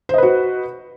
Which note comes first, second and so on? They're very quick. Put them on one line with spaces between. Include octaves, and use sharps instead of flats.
C5 D#5 B4 F#4